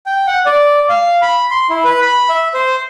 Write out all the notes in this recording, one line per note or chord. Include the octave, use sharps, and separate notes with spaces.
G5
F#5
D5
F5
B5
C6
E4
B4
B5
E5
C5